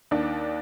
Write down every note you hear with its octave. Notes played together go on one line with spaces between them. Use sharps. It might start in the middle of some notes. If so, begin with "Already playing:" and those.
D#2 D4